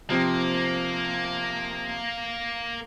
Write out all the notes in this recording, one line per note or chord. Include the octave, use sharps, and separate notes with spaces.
C3 F3 A#3 C4